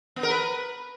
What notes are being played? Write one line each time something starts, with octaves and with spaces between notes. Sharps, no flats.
B3
A#4
B4